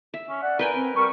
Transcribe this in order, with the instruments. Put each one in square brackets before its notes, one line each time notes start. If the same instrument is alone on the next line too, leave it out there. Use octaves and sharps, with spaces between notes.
[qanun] E5
[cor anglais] C#4
[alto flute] D5 [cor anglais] F#5
[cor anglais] A#4 [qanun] B4 G5 G#5
[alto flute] C4
[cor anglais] G3 [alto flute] A#4 [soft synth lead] C#6